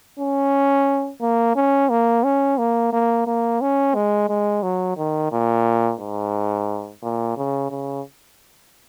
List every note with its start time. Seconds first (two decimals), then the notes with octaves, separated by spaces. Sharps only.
0.19 C#4
1.21 A#3
1.56 C#4
1.89 A#3
2.24 C#4
2.58 A#3
2.93 A#3
3.27 A#3
3.61 C#4
3.95 G#3
4.29 G#3
4.63 F#3
4.97 D#3
5.32 A#2
6.00 G#2
7.03 A#2
7.37 C#3
7.70 C#3